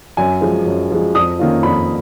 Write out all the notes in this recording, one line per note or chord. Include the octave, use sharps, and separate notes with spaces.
F#2 G#5
F3 G#3
F#2
F3 G#3
F2 D#6
D#3 A#3 C#4 F4
F2 B5